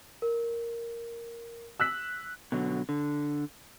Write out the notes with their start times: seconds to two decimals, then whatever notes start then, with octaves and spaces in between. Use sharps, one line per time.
0.22 A#4
1.80 E6 F#6 B6
2.52 B2 D3 F#3
2.89 D3